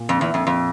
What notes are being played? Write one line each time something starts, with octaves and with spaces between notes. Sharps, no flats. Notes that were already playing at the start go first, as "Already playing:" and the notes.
Already playing: A#2
F2
E2
F2
F2